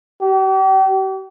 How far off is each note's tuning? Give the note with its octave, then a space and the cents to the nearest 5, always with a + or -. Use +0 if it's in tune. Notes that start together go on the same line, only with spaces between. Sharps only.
G4 -40